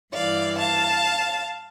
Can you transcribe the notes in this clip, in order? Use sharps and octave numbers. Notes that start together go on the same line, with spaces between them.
G2 E3 D5 F5
F5 A5